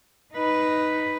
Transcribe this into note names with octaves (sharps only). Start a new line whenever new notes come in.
D#4 B4